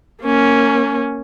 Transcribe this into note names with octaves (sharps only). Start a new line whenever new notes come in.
A#3 C#4